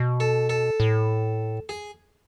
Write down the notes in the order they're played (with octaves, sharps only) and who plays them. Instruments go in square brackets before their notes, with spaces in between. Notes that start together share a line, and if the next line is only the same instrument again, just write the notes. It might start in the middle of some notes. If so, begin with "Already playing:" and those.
Already playing: [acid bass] B2
[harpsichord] A4
A4
[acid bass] A2
[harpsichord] G#4